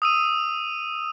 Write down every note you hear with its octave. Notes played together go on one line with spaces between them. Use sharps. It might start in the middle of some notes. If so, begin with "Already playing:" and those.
D#6 E6 D#7